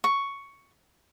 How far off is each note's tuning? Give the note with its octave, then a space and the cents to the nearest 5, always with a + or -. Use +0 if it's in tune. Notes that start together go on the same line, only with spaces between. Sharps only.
C#6 +5